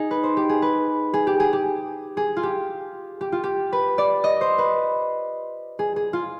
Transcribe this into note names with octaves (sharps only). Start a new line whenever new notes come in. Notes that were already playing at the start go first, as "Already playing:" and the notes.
Already playing: D#4 G#4
B4
C5
G4
G#4
B4
G#4
G4
G#4
G4
G#4
F4
G4
G4
F4
G4
B4
D5
D#5
C5
B4
G#4
G#4
F4